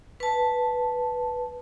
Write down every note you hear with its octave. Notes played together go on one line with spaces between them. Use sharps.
B4 A5